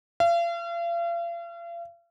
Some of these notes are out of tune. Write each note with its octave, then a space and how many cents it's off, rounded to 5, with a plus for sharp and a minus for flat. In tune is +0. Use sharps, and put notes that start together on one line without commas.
F5 -40